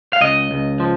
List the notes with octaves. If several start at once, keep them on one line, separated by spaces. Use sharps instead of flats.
F5
C#2 D#5
C#2
F3